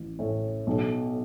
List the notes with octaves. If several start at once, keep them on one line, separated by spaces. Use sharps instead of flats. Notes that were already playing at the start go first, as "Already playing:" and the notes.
Already playing: A1
A2
B1